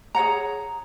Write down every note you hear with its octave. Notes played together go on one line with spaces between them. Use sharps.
G#4 C#5 F#5 A#5